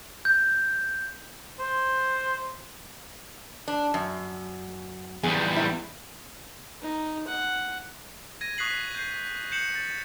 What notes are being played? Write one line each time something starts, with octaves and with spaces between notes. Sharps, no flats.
G6
C5
D4
F#2
E2 G3 G#4
E4
D#4
F#5
G#6 A#6 D#7
C#6 D#6 F#6 B6 C7 F#7
G6 C7
G6 C7 C#7 E7 F#7
A6